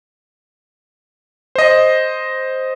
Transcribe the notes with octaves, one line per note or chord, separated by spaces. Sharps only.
C5 D#5